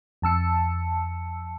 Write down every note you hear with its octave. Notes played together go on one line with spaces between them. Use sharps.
F2 A5 E6 C#7